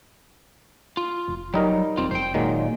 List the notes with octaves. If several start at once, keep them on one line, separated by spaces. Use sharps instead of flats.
F4
F1
F#3 G3 D#4 A#4
E1 C4 F4
F1 C5 G5
A#2 D#3 F#3 G#3